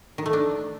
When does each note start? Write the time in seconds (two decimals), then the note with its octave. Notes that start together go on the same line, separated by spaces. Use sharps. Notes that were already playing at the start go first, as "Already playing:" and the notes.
0.18 D#3
0.26 A3
0.33 D4